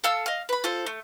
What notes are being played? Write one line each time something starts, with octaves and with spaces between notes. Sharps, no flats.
A4 F5 A5 E6
D#5 F5
B4 B5
F4 A4 C5
A3